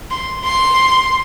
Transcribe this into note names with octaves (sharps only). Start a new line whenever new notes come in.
C6
C6